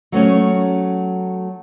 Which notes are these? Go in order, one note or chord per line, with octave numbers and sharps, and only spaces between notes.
F#3 A3 C#4 C#5